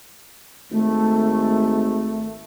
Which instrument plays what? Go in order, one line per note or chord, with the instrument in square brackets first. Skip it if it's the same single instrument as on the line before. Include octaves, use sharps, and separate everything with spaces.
[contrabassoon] G#1 [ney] A3